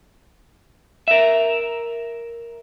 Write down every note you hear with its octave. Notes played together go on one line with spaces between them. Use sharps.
A#4 E5